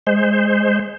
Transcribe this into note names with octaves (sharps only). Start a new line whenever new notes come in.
G#3 C5